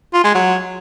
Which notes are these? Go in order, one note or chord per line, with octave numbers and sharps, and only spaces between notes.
F4
G#3
F#3